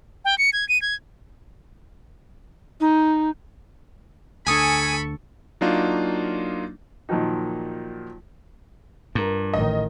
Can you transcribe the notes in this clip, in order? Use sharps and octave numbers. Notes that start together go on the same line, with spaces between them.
G5
C#7
G#6
D#7
G#6
D#4
D2 D3 A4 G#5 B5 C#6 D#6
F#3 A#3 D4 D#4 F4
A#2 D#3 F3 F#3 D#4
G2 F4 A#4
A1 D#3 D#5